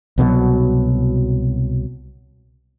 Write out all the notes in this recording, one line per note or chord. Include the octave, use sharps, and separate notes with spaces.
C2 B2 D3 F#3